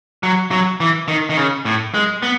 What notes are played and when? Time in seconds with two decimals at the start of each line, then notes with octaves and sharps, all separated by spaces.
0.23 F#3
0.51 F#3
0.80 E3
1.08 D#3
1.29 D#3
1.37 C#3
1.65 A2
1.94 G#3
2.23 B3